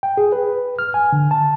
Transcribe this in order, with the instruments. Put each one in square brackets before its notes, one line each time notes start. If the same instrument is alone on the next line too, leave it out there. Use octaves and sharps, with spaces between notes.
[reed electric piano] G5
G#4
B4
F6
G#5
D3
A5